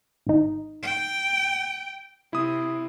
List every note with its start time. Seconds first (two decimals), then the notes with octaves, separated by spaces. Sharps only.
0.27 G#1 D#4
0.83 G5
2.33 C3 E4 D#6